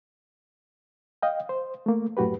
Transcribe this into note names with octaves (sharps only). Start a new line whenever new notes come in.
D#5 F5 G5
C5
A3 A#3
F#2 A2 F#4 G4 B4